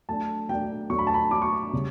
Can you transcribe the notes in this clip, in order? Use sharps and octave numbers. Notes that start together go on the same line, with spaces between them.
F#3 A3 D4 A5
F#3 A3 D4 G5
F#3 A3 D4 C#6
B5
A5
B5
F#3 A3 D4 D6
C#6
D6
C#3 G3